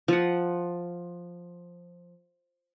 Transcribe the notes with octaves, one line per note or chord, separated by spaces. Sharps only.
F3 F#5